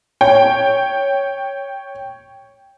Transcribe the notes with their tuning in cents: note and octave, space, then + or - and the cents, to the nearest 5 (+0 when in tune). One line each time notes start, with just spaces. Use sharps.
C#5 +0 G5 +0